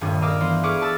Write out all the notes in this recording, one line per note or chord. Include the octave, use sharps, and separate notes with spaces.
D#1 G2 C#4
A#4 D#5 F5 D6 E6 F6
E3 B3 C5
G#4 B4 C#6 D6 F6
A5 B5 E6